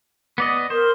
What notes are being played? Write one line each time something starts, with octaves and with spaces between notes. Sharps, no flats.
B3 D5 D#5
A#4 C5